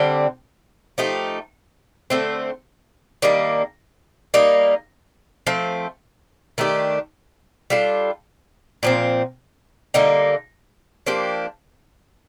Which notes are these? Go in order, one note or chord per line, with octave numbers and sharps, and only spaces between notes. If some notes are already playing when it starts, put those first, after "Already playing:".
Already playing: D3 G3 C4
F3 A3 D#4 G4
D3 A3 C4
D#3 G3 A#3 D4
G3 A#3 D#4
F3 A3 C4
D#3 A3 D4 G4
G3 D4 F4 A4
A#2 F3 C4
D3 G3 A#3 D#4
F3 A#3 D4 G4